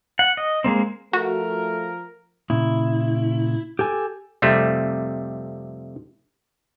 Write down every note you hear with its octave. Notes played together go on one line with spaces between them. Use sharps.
F#5
D#5
G#3 A#3 C4
F3 A3 F#4 A#4
A#2 C#3 E4
G4 A4 G#5
F2 C3 G3 A3